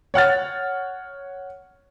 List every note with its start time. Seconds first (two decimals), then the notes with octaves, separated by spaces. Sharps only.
0.14 C#5 F#5 F6 A6